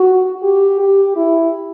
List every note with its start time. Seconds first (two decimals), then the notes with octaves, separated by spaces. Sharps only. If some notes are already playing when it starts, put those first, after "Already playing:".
Already playing: F#4
0.43 G4
0.80 G4
1.16 E4